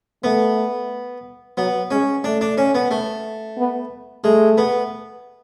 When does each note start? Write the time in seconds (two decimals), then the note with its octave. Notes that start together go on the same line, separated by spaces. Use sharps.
0.24 A3 B3
1.57 F#3 B3
1.91 G#3 C#4
2.24 A3 D4
2.41 D4
2.58 C#4
2.75 B3
2.91 A3
3.58 B3
4.24 G#3 A3
4.58 B3